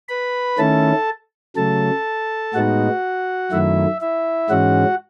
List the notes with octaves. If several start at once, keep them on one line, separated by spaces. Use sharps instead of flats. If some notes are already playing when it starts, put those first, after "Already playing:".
B4 B5
D#3 A3 C#4 E4 A4 A5
C#3 F#3 A3 A4 A5
A2 G#3 B3 D#4 F#4 F#5
F#2 D#3 F#3 A3 E4 E5
E4 E5
G#2 E3 G#3 C#4 F#4 F#5